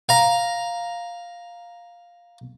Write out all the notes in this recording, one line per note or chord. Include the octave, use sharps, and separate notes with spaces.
F5 A#5